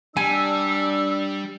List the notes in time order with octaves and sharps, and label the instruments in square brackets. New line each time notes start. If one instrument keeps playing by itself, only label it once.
[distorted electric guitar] G3 [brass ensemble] D4 [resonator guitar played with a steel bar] G#5 [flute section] E6